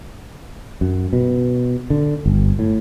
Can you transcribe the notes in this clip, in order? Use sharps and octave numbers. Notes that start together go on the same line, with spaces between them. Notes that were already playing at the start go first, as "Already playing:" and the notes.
F#2
B2
D3
G1
A2